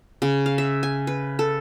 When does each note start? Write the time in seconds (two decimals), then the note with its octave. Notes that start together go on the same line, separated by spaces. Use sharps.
0.22 C#3
0.46 F5
0.58 E5
0.83 G#5
1.07 B4
1.39 A4